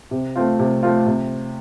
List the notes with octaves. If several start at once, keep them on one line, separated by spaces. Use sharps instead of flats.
C3
A3 C4 F4
C3
A3 C4 F4
C3